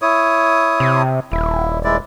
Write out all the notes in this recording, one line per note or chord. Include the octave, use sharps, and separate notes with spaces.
E4 C#5 D#6
C3
D#1 E4
G#3 E4 D5